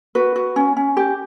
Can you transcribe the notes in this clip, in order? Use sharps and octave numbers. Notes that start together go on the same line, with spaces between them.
F#4 B4
F#4
C#4
C#4
G4